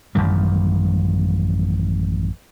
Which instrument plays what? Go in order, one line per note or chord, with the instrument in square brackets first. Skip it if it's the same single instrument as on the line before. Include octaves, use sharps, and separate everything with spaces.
[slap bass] A1 F#2 D#3 G3